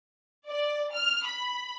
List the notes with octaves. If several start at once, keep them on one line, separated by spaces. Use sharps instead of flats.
D5
F6
B5